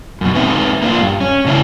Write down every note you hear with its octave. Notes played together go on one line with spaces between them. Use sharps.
F#2 B2
G#2 C4 D#4 B4 E5
A#3 D4 F4
G2
C#4
G#2 C#3 D4 E4